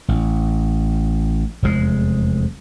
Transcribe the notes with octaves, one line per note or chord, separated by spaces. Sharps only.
A1
F1 E2 G#2 G#3